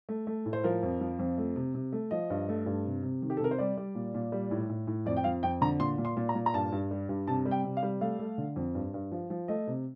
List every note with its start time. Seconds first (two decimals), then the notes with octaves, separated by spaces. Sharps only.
0.09 A3
0.27 A3
0.46 A2
0.53 C5
0.64 F3 A#4
0.83 F2
1.01 F3
1.19 F2
1.38 A3
1.56 C3
1.74 C3
1.92 A3
2.11 F3 D#5
2.30 G2
2.49 A3
2.66 G2
2.85 C3
3.03 C3
3.22 D#3
3.30 G4
3.37 A4
3.40 C3 A#4
3.51 C5
3.58 G3 D5
3.77 G3
3.95 A#2
4.14 A#2
4.32 G3
4.51 A2
4.69 A2
4.87 A2
5.06 F2 D5
5.17 G5
5.24 F2 F5
5.43 F2 G5
5.61 D3 A#5
5.80 A#2 C6
5.98 A#2
6.05 C6
6.17 A#2
6.29 A#5
6.35 A#2
6.46 A#5
6.54 G2 A5
6.72 G2
6.91 G3
7.09 G2
7.27 C3 A5
7.45 G3
7.51 G5
7.64 C3
7.77 F5
7.83 G3
8.01 A3 F5
8.19 A3
8.38 D3
8.56 F2
8.75 G2
8.94 G2
9.12 F3
9.30 F3
9.48 A3 D#5
9.67 C3